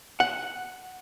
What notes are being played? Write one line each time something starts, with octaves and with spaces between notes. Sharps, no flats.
F#5